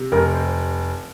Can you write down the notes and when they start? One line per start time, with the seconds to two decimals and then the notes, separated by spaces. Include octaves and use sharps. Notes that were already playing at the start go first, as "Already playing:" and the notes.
Already playing: C3
0.12 F1 A#4
0.34 C5